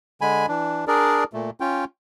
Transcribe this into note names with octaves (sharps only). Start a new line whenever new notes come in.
D3 G#3 G#5 B5
E3 D4
D4 G#4 A#4 D5
A#2 A3
C#4 F4 G5